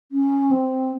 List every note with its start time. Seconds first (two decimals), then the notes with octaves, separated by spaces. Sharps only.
0.12 C#4
0.51 C4